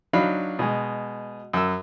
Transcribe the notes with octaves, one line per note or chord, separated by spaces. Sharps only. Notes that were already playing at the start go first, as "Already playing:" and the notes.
F#3 D4 D#4 F5 B5
B2 G#3
F#2 E6